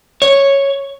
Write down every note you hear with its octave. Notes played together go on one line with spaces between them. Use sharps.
C#5